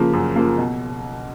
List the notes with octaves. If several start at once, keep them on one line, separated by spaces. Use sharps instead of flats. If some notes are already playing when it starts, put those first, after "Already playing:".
Already playing: C#3 F3 A#3
F#2
C#3 F3 A#3
B2